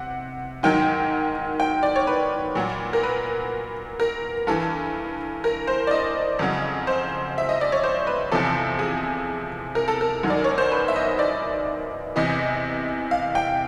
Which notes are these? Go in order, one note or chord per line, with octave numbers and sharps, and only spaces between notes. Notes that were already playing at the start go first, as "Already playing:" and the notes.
Already playing: C3 F#5
G#2 D#3 F#3 G5
G5
D5
C#5
B4
A#2 F#3
A#4
B4
A#4
G2 E3 A4
A#4
C5
D5
D#5
F2 C#3 F#3
C5
E5
D#5
D5
C#5
C5
B4
E2 C3 F3 A4
G#4
A#4
A4
A#4
F#2 D#3 F#3
D5
C#5
C5
B4
E5
D#5
D5
E2 C3 E3 D#5
F5
G5